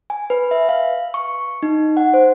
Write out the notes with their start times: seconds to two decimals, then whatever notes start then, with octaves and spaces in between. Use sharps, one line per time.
0.10 G#5
0.30 B4
0.51 E5
0.69 F5
1.14 C#6
1.63 D#4
1.97 F#5
2.14 C5